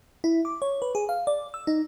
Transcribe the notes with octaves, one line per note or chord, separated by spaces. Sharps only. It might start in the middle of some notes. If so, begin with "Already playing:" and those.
E4
D6
C#5
B4
G#4
F5
D5
E6
D#4